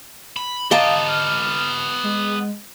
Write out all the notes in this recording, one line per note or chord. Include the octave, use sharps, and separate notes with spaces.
B5
B3 G4 D#5 F5 A5 A#5
F6
G#3